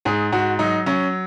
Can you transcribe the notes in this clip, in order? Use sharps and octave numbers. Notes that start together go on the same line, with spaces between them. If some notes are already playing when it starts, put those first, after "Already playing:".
G#2 G#4
G#2 F#4
F#3 D#4
F#3 C#4